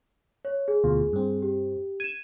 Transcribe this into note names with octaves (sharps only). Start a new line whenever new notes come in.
C#5
G#4
D2 B2 F4
G2 C4
G4
G#6 D#7 E7